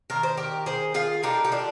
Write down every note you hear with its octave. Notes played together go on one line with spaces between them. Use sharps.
D#3 A#3 D4 A#4
C5
G4 A#4
G#4 C5
F4 G#4
D3 G3 A#3 D4 D#4 G4
G4
D4 F4